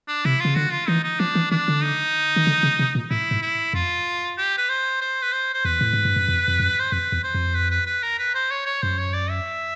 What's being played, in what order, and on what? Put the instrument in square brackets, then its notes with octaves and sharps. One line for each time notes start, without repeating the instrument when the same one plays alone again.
[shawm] D4
[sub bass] C3 [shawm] E4
[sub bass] C#3 [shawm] F4
[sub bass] D3 [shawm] F#4
[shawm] F4
[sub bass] E3 [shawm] D#4
[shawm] D#4
[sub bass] F3 [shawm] D4
[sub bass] E3
[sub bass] D#3 [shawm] D4
[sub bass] D3
[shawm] D#4
[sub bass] D#3
D3
C#3
C3
A#2
[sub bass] A2 [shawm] E4
[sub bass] G#2
[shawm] E4
[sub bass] F2 [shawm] F4
[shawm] G4
B4
C5
C5
B4
C5
C5
[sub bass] E2 [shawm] B4
[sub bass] A2
G#2
G2
F#2
F2
F2
F#2
[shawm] C5
[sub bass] F2 [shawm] B4
[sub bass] E2
[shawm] C5
[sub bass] F2
[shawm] B4
B4
B4
A#4
B4
C5
C#5
C#5
[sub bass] F#2 [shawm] C5
[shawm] C#5
D5
E5